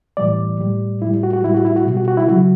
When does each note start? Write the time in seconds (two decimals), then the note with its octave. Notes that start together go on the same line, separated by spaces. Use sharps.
0.17 A2 E3 G3 D5
0.60 A2 G3
1.02 A2 G3 E4
1.23 F#4
1.33 F#4
1.44 A2 G3 E4
1.54 F#4
1.65 E4
1.76 F#4
1.87 B2 G3
1.97 F#4
2.08 F#4
2.17 E4
2.28 C#3 F#3 F#4